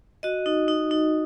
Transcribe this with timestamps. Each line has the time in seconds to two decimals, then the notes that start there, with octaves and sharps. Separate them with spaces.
0.23 F#4 D#5
0.46 D#4
0.68 D#4
0.91 D#4